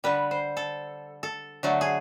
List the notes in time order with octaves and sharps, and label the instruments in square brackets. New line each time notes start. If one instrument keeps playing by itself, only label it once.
[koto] D3 G3 B4
C5
A4
A4
D3 F#3 A3
G#4